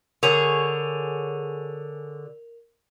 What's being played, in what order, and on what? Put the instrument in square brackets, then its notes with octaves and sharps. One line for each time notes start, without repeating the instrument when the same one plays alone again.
[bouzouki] D3 G#4 C#5 [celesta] A#4 F7